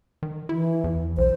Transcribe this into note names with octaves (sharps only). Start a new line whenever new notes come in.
D#3
E3 E4
E2
B1 C5